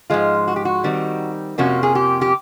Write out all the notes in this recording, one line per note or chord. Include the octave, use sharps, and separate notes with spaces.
G#2 F3 G#3 F4
F#4
G4
F#4
D#3 G3 C4 D#4
F2 C3 F3 A#3 C#4 F#4
G#4
G4
G4